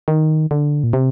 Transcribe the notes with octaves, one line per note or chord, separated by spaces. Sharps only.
D#3
D3
A#2
C3